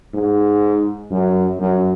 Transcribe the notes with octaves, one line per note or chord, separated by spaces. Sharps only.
G#2
F#2
F#2